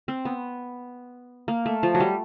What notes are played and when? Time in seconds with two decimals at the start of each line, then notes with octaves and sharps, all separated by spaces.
0.08 C4
0.25 B3
1.48 A#3
1.66 A3
1.83 F3
1.95 F#3
2.00 G3